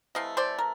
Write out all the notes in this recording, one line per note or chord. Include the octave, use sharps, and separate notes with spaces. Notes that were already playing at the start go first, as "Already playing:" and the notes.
C3 E3 A3 D#5 F5
C5 D5
A#4